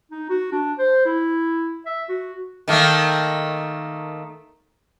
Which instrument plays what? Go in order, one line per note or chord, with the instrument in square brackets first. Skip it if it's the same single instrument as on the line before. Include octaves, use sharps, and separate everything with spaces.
[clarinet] D#4
F#4
D4
C5
E4
E5
F#4
[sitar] D#3 A3 A#3